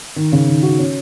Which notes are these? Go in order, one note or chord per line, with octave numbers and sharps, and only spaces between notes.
D#3
C#3
D#3
F#4
C#4